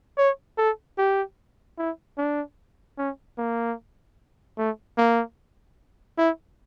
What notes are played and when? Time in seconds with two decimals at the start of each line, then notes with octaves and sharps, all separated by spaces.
0.18 C#5
0.58 A4
0.98 G4
1.78 E4
2.18 D4
2.98 C#4
3.38 A#3
4.58 A3
4.98 A#3
6.18 E4